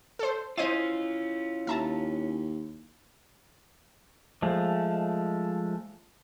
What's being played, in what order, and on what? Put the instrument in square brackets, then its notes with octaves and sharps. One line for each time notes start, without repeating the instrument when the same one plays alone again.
[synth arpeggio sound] A4 C5
[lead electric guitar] C#4 F4 [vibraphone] E4 [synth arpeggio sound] C5 D#5 D#7
[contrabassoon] D#2 [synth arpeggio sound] E5 A5 A#5
[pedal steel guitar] F3 G#3 A3